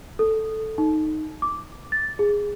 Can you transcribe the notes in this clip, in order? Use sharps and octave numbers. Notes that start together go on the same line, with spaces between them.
A4
D#4
D6
A6
G#4